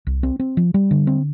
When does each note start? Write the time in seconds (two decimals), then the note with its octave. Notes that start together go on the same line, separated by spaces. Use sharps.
0.07 C2
0.23 C4
0.40 C4
0.57 F3
0.74 G3
0.91 D3
1.07 C4